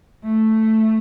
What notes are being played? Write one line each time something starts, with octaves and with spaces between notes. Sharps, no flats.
A3